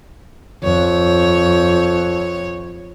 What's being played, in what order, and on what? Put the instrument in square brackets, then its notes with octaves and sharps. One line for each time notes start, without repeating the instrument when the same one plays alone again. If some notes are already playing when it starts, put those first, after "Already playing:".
[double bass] F2 [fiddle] C#5